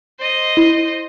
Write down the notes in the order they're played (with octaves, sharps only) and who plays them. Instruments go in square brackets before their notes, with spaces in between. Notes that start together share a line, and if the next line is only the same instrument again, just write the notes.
[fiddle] C5 D#5
[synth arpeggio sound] E4